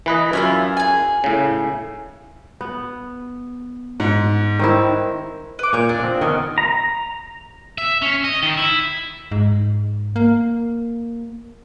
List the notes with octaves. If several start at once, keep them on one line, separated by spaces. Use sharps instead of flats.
E3 B4 D#5
F#2 E4 F4 G#5
G#4 G#5
A2 C#3
B3
G#2 F#5
D#3 C4 E4
B4 D6
A#2 C#5 G6
D4
F3 C4
D#3 B3 C#4 D5
A#5
E5
C#4
D#5
D#3
E4
G#2
A#3